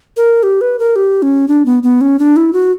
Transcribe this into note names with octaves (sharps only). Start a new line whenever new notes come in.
A#4
G4
B4
A#4
G4
C#4
D4
B3
B3
C#4
D4
E4
F#4